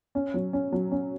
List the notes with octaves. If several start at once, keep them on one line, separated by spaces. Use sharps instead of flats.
C#4
F#3
C#4
F#3
C#4